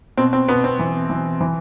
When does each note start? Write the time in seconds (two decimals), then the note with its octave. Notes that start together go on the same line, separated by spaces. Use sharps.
0.17 B2 C4
0.33 C4
0.48 B2 B3
0.64 C4
0.79 E3
1.10 E3
1.41 E3